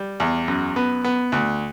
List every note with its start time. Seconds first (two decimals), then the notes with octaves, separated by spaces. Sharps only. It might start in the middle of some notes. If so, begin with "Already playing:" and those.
Already playing: G3
0.20 E2
0.48 F#2
0.76 B3
1.04 B3
1.32 D2